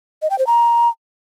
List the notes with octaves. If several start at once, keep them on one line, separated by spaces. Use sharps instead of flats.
D#5
G5
C5
A#5